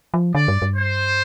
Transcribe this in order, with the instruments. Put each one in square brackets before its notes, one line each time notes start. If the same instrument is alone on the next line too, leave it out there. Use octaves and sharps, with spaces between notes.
[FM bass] F3
[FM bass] D3 [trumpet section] D5
[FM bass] G2
G2
[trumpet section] C5